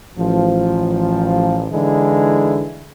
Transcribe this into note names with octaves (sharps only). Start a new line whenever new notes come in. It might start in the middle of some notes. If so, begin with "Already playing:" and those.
A1 F3
D3 E3 G#3 D#4 E4